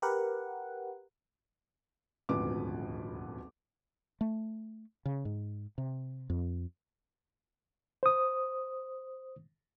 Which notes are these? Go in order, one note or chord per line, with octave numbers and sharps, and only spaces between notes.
G4 A#4 B4 F#5
D#1 G#1 D2 F3 B4 D6
A3
C#3
G#2
C3
F2
C5 D#6